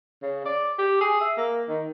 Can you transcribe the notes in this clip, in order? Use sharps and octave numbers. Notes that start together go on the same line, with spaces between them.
C#3
D5
G4
G#4
E5
A#3
D#3